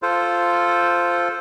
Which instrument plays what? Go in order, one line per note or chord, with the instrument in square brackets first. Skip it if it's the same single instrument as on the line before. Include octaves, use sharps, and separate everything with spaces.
[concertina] F4 A4 C5